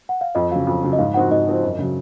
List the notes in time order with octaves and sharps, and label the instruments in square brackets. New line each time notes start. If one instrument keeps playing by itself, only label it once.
[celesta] F#5
F5
[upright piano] F2 [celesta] D#5
[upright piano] C#3 F#3 [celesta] F5
[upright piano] F2
C#3 F#3
[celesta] D#5
[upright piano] G#2 [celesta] F5
[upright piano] F3 C4 D#4 F#4 [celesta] F#5
[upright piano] G#2 [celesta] D#5
[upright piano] F3 C4 D#4 F#4
F#2
C#3 F#3